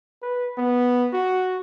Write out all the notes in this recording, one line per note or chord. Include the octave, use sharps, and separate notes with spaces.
B4
B3
F#4